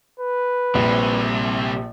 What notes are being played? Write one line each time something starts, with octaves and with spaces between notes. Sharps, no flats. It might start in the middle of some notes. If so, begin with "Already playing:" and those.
B4
A#1 C3 G3